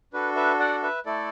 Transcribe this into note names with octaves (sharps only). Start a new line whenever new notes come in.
D4 F#4 A4 B4
B4 E5
D5 F#5
B4 E5
A3 E4 A4 D5